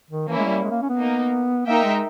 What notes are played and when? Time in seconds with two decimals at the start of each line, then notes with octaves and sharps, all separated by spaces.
0.11 D#3
0.28 E3 A#3 C#4 E4
0.38 G#3
0.45 G3
0.63 G#3
0.71 A#3
0.82 C#4
0.89 B3
0.97 A#3 D#4 A#4
1.66 A#3 D#4 A#4 E5 G5
1.84 G#3